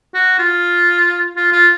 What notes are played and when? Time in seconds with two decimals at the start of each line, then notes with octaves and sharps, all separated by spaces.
0.14 F#4
0.39 F4
1.36 F4
1.53 F4